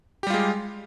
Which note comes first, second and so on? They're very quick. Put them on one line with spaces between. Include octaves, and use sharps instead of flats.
G4 G3 F4 G#3